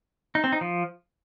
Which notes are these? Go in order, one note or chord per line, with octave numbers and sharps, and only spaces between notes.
D#4
C4
D#4
F3